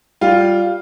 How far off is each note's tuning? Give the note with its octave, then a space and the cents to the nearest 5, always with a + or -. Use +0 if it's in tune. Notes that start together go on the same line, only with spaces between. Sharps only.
G3 -5 F4 +0 G5 +0